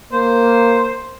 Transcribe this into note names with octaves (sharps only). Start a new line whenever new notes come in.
A#3 C5